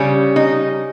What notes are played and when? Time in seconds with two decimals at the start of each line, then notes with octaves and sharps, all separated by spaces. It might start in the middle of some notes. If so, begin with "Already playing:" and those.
Already playing: C#3 G3 C#4
0.36 D#4